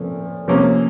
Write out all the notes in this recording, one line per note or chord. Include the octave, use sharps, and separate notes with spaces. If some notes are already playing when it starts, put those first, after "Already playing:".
Already playing: A#2 F3 A3 C#4
C3 F3 A#3 C#4